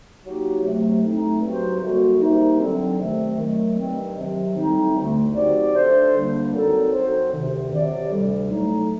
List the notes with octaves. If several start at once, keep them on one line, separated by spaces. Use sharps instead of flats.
F#3 A#3 D#4 G4
C3 F#3 A3
A2 A3 C4 D#4
G2 F#3 C4 F#4 C5
F#2 D3 G3 A#3 F#4
C3 D#3 G3 A#3 D#4
D3 F#3 C4
C3 D#3 A3 C4
D#3 F#3 A3
G2 D#3 F#3 C4
C3 D#3 F#3
A2 G3 C4 D#4
D2 D3 A3
F#3 C4 D#4 G4 D5
D3 A3 D4 A4 C5
D2 D3 G3 A#3 D4
A#2 F#3 C4 D#4 A4
F#3 C4 D#4 A4 C5
D2 C3 D#3
C3 F#3 C4 G4 D5
D2 C3 G3
A2 F#3 A3 D#4